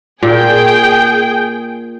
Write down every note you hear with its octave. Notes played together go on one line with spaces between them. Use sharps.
A#2 G#4 G5